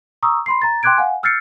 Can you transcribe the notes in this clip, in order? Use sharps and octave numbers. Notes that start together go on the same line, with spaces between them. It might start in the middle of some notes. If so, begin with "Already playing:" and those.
A#5 C#6 D#6 E6
B5 C6 C7
A#5 A6
G5 C6 D6 F#6 G#6 D7
F5 F#5 G#5
E6 F6 G6 A6 C7 C#7